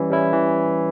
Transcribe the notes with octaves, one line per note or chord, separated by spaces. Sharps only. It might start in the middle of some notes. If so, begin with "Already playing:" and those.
Already playing: E3 G3 C#4 E4
G3 C#4 E4
E3